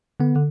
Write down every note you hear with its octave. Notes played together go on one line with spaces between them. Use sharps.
D3 B3
D3